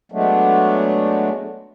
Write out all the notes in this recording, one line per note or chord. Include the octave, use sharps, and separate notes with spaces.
F#3 G#3 A3 B3 D4